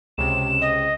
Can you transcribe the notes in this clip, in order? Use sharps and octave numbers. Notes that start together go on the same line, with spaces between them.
C#2 C3 E7
D#5